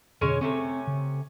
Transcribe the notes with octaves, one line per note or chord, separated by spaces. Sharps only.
F2 B2 D3 G#3 C#4 C#5
C3 A3 C4 C#4
C#3